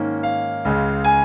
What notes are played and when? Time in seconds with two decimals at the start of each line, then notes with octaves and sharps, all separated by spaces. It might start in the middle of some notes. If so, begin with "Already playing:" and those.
Already playing: G#2 D#3 A#3 C#4
0.23 F5
0.65 C#2 C#3 G#3
1.04 G#5